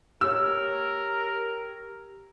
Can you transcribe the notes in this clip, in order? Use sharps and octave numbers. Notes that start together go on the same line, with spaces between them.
G4 A#4 C#5 E6